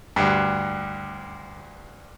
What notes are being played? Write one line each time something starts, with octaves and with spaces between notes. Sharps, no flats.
D2 G2